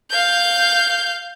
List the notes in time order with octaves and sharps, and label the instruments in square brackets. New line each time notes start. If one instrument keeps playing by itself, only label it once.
[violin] F5 G6